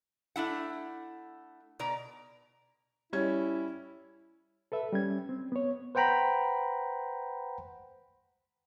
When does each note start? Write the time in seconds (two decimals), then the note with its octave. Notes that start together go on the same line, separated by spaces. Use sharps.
0.36 A3 D4 E4 F#5
1.79 B2 D5 A#5
3.13 G3 C#4 E4 G#6
4.72 A4 B4 E5
4.93 G3 C#4 G#6
5.29 C4
5.52 B3 C#5
5.95 B4 C5 F#5 G5 A#5 B5